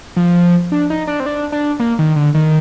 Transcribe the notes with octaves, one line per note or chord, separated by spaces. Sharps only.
F3
D4
D#4
D4
C4
D4
D4
A#3
D#3
D3
D#3